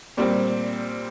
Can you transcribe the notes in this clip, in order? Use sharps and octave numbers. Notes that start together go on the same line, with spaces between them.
A#2 G3 C4